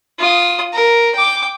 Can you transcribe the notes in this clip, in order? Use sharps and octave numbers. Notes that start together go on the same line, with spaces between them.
F4 D#6
A#4
G5 D6